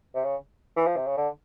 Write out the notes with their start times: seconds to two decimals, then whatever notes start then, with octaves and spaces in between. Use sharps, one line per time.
0.15 C3
0.24 C#3
0.76 E3
0.86 F3
0.96 C3
1.06 C#3
1.17 D3